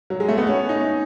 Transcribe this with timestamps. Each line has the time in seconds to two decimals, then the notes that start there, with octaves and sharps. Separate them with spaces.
0.10 F#3
0.20 G#3
0.28 A3
0.38 B3
0.47 C#4
0.69 D#4